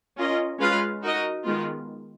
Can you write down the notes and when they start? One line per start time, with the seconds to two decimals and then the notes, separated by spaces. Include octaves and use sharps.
0.17 C#4 F4 A#4 D#5
0.59 G#3 C#4 F4 B4 F5
1.02 D#4 F#4 A#4 D#5
1.44 D#3 G#3 B3 F4